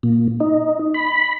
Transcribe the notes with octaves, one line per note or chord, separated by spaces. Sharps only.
A#2
D#4
B5